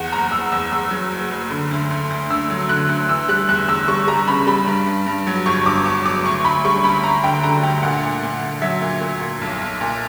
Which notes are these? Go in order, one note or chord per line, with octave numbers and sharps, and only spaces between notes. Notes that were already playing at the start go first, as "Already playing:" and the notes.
Already playing: E2 F#5
F#1 A#5
E2 E6
E2 E6
E2 E6
F#3
F#1
F#1
D3
D2
D2
D2
D2 E6
F#3
D3 F#6
D2
E3 E6
G3 F#6
E2 F#6
E2 E6
G3 C#6
G3 A#5
C#3 B5
G3 B5
G2
G2
G2
F#3
G1 C#6
G2 D6
G1 D6
F#3 D6
D2 C#6
D2 B5
G3 C#6
D2 B5
D2 A#5
D3 G5
D3 A#5
D2 G5
A#2 F#5
A#2
A#2
A#2
F#3 E5
A#2
A#2
A#2
B1
B1
A#2